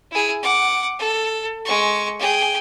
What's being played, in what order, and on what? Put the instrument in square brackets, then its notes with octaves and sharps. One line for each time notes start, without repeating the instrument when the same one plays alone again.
[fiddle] E4 G#4
F#5 D6
A4
G#3 C#6
G#4 G5